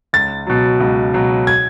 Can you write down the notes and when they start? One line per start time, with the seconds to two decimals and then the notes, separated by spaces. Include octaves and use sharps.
0.13 C#2 A6
0.47 B2 F#3
0.80 C#2
1.14 B2 F#3
1.47 G#6